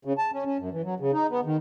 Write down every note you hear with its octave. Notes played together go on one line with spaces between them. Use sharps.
C#3
A5
C#4
C#4
F#2
E3
F#3
C#3
D#4
B3
D#3